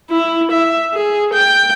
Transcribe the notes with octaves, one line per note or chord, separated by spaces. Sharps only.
E4
E5
G#4
G5